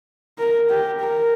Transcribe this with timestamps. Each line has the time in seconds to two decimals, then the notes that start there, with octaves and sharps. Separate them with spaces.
0.38 A#4
0.70 G4
1.00 A#4